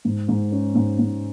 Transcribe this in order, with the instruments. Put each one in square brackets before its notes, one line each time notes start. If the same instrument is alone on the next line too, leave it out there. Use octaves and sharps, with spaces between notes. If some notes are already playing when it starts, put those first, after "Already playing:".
[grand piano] G#2
G#2
C#4
G#2
G#2